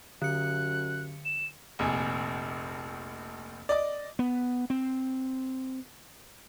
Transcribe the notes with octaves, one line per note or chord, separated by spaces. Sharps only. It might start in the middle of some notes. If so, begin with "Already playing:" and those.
F#2 D3 F#6 C#7
E7
F1 A#1 G#5
D5 D#5 D6
B3
C4